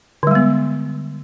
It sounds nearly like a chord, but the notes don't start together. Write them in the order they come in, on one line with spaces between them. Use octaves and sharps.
D3 G3 G#3 B3